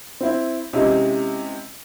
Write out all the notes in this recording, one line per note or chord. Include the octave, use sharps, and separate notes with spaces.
C4 E4
C3 G#3 C#4 D#4 E4 G4